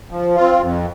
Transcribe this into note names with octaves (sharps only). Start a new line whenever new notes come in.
F3
F4
C4
F2